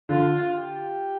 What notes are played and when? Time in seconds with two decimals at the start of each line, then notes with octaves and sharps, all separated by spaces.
0.09 D3 F4
0.58 G4